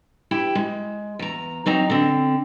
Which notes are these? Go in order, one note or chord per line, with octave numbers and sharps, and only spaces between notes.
E4 G4 G5
G#3
E2 A#5
F#3 C4 D#4 A#5
D3 C4